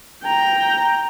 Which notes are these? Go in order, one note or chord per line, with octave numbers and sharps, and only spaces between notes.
G5 A#5